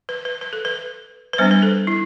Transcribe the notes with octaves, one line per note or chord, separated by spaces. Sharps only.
B4
B4
B4
A4
B4
B4
G3 B3 D4 C5
B4
A4
E4